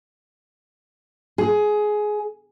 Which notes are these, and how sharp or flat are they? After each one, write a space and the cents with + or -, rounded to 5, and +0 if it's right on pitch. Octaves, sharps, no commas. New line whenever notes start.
G#4 +15